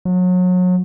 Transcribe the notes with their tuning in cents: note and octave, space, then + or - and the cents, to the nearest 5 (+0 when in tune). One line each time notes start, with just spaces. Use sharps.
F#3 -30